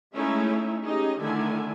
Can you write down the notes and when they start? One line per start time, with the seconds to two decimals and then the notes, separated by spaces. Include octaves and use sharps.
0.14 G#3 A3 C#4 D#4 E4 E5
0.83 C#4 D#4 G4 G#4 D#5
1.20 D3 D#3 A3 E4 E5 G#5